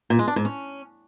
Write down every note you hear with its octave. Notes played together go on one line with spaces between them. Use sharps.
A#2
G#3
D4
G#2
C#4